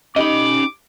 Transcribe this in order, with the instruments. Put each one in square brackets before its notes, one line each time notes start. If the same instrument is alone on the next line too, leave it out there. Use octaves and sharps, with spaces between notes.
[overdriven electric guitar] C#4 B5 [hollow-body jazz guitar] D#4 G4 D#5 [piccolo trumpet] D6